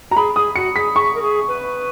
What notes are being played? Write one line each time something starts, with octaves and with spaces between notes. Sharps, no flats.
F#4 A#5
G#4 B5
G#4 D#6
F#4 C#7
G#4 B6
G#4 C#6
A#4
G#4
B4